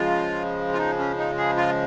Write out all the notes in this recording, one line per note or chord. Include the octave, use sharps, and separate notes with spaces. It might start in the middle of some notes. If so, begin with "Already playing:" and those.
Already playing: C#3 F3 G#3 F4
F4
D#4
C#4
D#4
G#4
F4